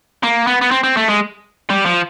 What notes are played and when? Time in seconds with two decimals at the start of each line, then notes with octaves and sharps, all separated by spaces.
0.23 A#3
0.47 B3
0.61 B3
0.71 C4
0.83 C4
0.97 A3
1.08 G#3
1.70 G3
1.86 F3